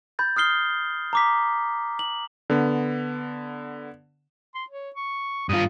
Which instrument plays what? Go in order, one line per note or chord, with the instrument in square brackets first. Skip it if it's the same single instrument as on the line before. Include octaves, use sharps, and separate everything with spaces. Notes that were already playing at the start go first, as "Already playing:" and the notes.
[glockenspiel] B5 G6 A6
D#6 F6 C7 G7
A#5 D6 B6
F#7
[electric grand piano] D3 B3
[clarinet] C6
C#5
C#6
[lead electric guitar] G2 F4 [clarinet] D#6